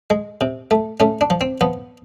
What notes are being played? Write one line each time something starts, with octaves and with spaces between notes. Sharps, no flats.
G#3
C3
A3
A3 C#4
D4
F3
C4
F3 B3